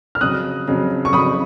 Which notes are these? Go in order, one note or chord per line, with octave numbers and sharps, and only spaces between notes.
F6
F2 C#3 F#3 D#6 F#6
F2 C#3 F#3
C#6
F2 C#3 F#3 B5 D#6